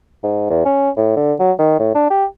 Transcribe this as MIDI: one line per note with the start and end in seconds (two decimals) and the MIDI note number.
0.24 0.49 44
0.50 0.65 40
0.65 0.90 61
0.97 1.13 45
1.17 1.33 50
1.40 1.52 54
1.59 1.75 51
1.79 1.93 45
1.95 2.09 62
2.10 2.25 67